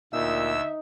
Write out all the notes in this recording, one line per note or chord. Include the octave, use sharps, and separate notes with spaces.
D2 A#2 D#4 E5 E6